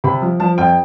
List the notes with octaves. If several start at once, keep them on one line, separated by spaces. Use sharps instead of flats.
C3 B5
F3
F3 A5
F2 G5